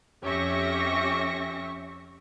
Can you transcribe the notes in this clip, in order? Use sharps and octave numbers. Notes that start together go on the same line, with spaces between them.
F2 C#4 G4 E5 C#6 A#6